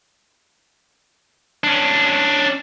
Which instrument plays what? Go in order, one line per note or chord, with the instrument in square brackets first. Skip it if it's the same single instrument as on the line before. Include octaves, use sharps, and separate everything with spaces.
[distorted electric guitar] C#4 D4